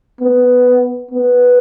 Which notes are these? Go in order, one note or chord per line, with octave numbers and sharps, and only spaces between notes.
B3
B3